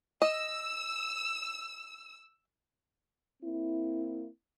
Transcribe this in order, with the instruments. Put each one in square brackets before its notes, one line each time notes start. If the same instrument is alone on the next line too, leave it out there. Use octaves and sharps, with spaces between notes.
[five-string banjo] D#5 [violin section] E6
[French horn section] A#3 C4 E4